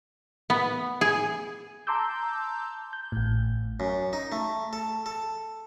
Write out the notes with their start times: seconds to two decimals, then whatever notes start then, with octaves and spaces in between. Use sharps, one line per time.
0.50 B3
1.01 G#4
1.87 A5 A#5 C6 D6 E6 G6
2.93 G6
3.12 A1 A2
3.80 F#2
4.13 D#4
4.32 A3
4.73 A4
5.06 A4